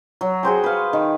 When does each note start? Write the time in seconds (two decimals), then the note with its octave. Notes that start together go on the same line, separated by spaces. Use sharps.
0.21 F#3
0.43 F#4 G#4 C5 G5
0.64 B4 F5
0.93 D#3